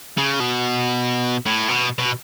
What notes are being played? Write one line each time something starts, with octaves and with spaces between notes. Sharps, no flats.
C#3
B2
A2
B2
B2